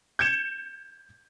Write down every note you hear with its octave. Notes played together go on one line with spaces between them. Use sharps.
G6 G#6 C#7 E7